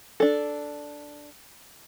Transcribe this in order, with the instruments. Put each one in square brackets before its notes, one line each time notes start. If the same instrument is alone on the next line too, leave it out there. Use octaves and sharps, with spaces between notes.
[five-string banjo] D4 A4